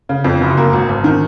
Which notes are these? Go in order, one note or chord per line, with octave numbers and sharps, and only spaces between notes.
C#3
F2
F#1
A#3
G#1
G#1
D#3